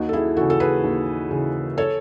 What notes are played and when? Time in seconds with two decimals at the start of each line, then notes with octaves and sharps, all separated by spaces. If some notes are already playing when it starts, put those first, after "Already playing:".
Already playing: D#2 D#4 F#4
0.09 A4
0.13 E4 G#4
0.36 C#3 E3 F#4 A4
0.50 A4
0.60 G#4 B4
0.84 D#2
1.31 C#3 E3
1.78 A4 C#5